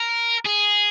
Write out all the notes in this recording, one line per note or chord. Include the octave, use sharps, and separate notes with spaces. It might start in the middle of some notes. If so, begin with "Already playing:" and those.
Already playing: A#4
G#4